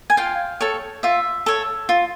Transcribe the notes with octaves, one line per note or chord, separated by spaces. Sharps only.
G#5
F4 F5 G5
A4 C#5
F4 E5
A4 C#5
F4